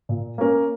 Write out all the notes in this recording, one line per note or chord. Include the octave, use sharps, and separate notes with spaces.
A#2
A#3 C#4 A#4